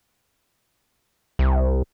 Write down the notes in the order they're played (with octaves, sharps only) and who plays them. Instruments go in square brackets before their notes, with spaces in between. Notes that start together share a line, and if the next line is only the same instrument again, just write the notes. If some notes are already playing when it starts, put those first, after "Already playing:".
[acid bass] C2